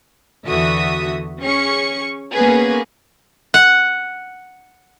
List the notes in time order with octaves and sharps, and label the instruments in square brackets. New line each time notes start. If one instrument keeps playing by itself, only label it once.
[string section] E2 D3 E3 F#4 E5 D#6
C#4 G#4 C#6 C#7
A#3 B3 C#4 G#4 B4
[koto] F#5